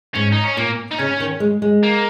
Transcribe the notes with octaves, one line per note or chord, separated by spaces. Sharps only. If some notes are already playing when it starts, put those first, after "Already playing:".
G#2 C#4
D#4
C#4
A#2 A#3
D#4
C#3 C#4
D#3
G#3
G#3
A#3